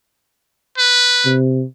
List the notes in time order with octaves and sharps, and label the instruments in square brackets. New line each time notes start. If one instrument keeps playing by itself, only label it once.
[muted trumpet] B4
[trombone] C3